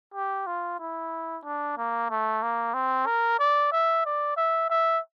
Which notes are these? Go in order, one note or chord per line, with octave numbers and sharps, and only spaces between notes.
G4
F4
E4
D4
A#3
A3
A#3
C4
A#4
D5
E5
D5
E5
E5